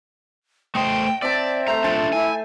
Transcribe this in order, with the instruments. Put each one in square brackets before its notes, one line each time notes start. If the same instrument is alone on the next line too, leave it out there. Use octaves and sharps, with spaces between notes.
[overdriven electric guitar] A3 C5 [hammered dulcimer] D#5 [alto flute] G5
[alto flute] C4 [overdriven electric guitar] D5 [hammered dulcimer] E5 A5
[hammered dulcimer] A3 C5 [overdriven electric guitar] A#5
[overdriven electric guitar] D4 F4 [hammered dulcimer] A5
[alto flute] E4 [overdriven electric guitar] G#5